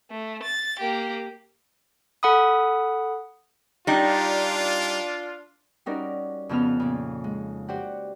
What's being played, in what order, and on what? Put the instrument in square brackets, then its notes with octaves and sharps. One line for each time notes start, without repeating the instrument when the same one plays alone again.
[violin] A3
A6
A#3 G4
[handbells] A4 F#5 B5 D#6
[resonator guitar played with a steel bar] G3 D#4 [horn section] D4 F4
[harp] G3 C#4 D#4 F#4 A#4 D5
F2 C#3 F3 B3 F4 F6
A#2 C#3
G#3
F#4 G4 C5 D5 F#5